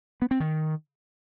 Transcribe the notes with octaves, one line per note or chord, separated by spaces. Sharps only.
B3
C4
D#3